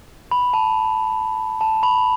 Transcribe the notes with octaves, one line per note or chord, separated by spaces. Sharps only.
B5
A5
A5
B5